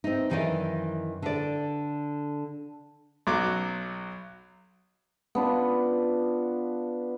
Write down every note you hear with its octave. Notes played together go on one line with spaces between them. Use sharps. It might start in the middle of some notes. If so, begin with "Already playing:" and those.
C4 D#4
F#2 D#3 E3 D5 D#5 F5
D3 D5
B1 F#3 D6
B3 D4 F4